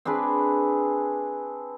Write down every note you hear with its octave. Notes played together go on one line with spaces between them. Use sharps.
C4 D4 G#4 B4